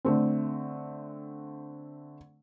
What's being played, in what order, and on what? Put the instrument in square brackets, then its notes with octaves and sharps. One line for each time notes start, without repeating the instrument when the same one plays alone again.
[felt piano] D3 A3 C4